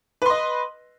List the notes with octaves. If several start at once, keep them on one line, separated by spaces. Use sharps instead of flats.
B4 D#5 C6